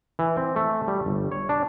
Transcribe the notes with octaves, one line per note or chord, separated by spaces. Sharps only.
E3
C4
A3
G3
G1
C#5
D4